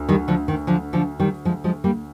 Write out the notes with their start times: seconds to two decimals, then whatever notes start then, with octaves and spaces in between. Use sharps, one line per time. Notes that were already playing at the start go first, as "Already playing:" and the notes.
Already playing: D2
0.09 D#3 G3
0.28 D3 F3
0.48 D#3
0.67 D3 F3
0.93 D3 F3
1.20 D#3 G3
1.45 F3 G#3
1.64 F3 G#3
1.84 G3 A#3